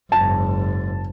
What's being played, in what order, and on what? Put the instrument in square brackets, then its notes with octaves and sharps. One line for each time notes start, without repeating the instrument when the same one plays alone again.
[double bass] F#1 G#2 [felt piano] A5